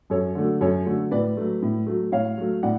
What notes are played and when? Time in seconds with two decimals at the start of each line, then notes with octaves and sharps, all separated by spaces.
0.10 F#2 A4 C#5
0.35 D3 F#3 A3
0.61 F#2 A4 C#5
0.86 D3 F#3 A3
1.11 A2 B4 D5
1.37 F#3 A3
1.62 A2
1.87 F#3 A3
2.12 A2 C#5 F5
2.38 F#3 A3
2.63 A2 D5 F#5